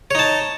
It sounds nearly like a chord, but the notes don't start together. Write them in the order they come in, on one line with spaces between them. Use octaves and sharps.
C#5 D#4 A5